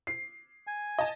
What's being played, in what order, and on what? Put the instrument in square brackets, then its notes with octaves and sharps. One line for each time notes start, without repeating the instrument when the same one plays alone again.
[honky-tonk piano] C7
[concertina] G#5
[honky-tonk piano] D#5 A5